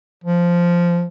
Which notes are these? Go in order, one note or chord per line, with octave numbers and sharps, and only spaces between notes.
F3